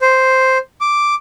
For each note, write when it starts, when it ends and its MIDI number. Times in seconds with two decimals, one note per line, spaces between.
0.01 0.58 72
0.81 1.15 86